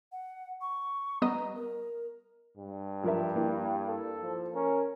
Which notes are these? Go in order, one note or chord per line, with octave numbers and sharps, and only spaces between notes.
F#5
C#6
G3 B3 D#5 A#5
A#4
G2
F3 G4 A#4 E5
A#3 E4
A4
F3
C#4 A#4